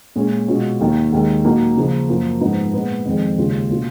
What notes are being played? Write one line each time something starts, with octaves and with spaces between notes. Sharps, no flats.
A#2 G#3 C#4
B2 G#3 C#4 F4
D#2 D#3 A#3
D#2 D#3 G#3
A#2 F#3 A#3 D#4
C#3 F3 A#3 F4
F#2 F3 A#3
G#2 F3 B3 D#4
A#2 G#3 B3
F2 D#3 G#3
D#2 C#3 G#3 C#4 F4
B2 A#3 F4